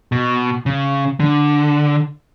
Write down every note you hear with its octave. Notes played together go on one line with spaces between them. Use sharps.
B2
C#3
D3